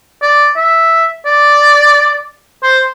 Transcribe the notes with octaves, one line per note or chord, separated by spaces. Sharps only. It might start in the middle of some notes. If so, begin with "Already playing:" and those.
D5
E5
D5
C5